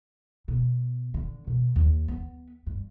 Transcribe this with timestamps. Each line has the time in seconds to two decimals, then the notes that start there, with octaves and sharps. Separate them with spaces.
0.48 B2
1.14 D3
1.47 B2
1.76 D#2
2.08 B3
2.67 G2